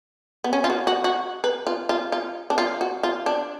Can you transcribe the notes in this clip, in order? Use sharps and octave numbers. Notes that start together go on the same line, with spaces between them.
B3
C#4
F4
F#4
F#4
F#4
B4
F4
F4
F4
D4
F4
F#4
F4
D4